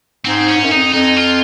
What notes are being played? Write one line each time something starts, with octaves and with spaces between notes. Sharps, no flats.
G#2 C4
C#4
G#2
F#2
F2 D#4
F2 D#4
F4